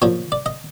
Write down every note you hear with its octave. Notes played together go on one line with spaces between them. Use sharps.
A#2 F3 C#5
D5
D#5